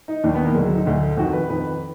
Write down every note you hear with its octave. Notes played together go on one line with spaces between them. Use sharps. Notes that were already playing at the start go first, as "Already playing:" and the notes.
D#4
D#2 D#3 D4
B3
A#3
D2 D3 G#3
F#3
D#4
D2 D3
F2 D#3 F#4
B4
F2 D#3 B4